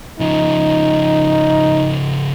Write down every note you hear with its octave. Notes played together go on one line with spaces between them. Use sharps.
C#3 F3 D#4